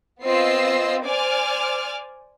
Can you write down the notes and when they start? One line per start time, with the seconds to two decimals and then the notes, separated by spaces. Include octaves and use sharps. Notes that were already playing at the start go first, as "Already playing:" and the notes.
0.23 B3 C4 F4 D#5 E6 C7
1.06 C5 D5 G#5 D6 F6